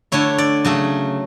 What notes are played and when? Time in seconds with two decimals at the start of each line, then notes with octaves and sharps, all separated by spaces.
0.12 D3 A3 E4 C#5
0.38 D5
0.65 C#3 F#3 A3